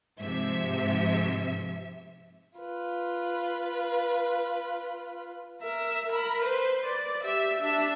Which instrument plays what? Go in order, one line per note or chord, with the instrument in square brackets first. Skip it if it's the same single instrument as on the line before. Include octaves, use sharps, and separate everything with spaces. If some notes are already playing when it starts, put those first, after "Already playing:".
[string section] G#2 C3 F3 E5
[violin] F4 B4
[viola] A#4 E5
A#4 B5
B4 C5
D5
G4 E5
D4 E5